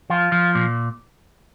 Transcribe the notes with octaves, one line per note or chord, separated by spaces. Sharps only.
F3 F4
F3
A#2